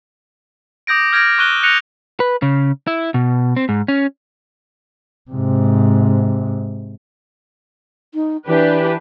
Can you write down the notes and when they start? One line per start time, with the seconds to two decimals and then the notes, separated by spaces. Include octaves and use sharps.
0.87 D6 D#6 G6 A#6 D7
1.12 F6 G6 G#6 A#6 D7
1.38 C#6 F#6 D#7 G7
1.63 F#6 A#6 C#7 D#7 F7
2.20 B4
2.42 C#3
2.87 E4
3.14 B2
3.56 C4
3.69 G#2
3.88 C#4
5.31 G#2 C3
8.14 D#4
8.47 E3 D4 G4 B4